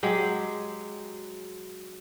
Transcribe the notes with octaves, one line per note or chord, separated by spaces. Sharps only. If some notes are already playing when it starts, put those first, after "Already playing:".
F#3 G#3 G4